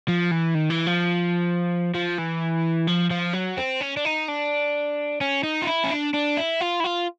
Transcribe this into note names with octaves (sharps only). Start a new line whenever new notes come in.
F3
E3
D#3
E3
F3
F3
E3
F3
F3
F#3
C4
C#4
D4
D#4
D4
C#4
D#4
F4
E4
C#4
D4
D4
E4
F4
E4
F4